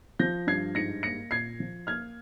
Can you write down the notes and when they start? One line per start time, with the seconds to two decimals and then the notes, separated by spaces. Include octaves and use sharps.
0.19 F3 G6 A#6
0.47 G2 G#6 C7
0.75 G#2 A#6 C#7
1.03 A#3 A#6 C#7
1.31 A#2 G#6 C7
1.60 F3
1.87 A#3 F6 G#6